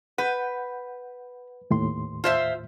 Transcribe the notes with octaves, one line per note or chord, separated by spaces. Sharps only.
B4 F#5 G6
D#2 A2 C6
F4 C5 E5